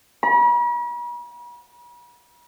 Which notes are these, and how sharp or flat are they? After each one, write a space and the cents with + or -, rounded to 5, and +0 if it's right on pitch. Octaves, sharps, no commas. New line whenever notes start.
B5 -45